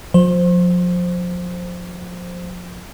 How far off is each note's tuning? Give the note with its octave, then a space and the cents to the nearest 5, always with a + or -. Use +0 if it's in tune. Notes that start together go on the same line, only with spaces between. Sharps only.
F3 +40 C5 +0